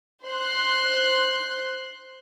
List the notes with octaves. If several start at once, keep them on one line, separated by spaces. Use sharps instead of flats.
C5 C6 F#6